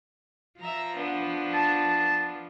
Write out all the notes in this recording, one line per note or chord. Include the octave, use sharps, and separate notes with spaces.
F3 E5 A#5
B3 D4
A5